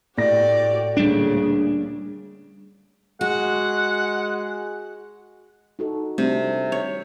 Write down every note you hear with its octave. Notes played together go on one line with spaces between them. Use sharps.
A2 F#4 G4 D5 A#6
D2 A#2 C#3 G3 D4
G#3 F#4 F#5
D#4 F#4 A4
C3 G3 A3 D4
C#5